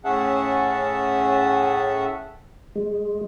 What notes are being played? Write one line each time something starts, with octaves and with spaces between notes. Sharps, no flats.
A2 C#4 G#4 E5 F#5 A5
G#3